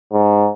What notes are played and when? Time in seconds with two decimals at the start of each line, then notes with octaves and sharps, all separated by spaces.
0.13 G#2